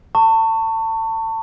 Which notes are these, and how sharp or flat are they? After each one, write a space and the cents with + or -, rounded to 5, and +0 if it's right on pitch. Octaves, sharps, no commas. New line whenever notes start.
A5 +30 C#6 +0